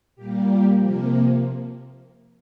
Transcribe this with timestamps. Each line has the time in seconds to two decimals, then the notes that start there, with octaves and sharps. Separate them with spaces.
0.16 A#2 G3 A#3 G4
0.47 G4
0.76 C3 F3 A#3